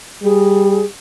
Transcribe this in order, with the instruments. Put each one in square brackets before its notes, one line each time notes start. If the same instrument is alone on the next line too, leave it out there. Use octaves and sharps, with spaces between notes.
[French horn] G3 [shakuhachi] G#4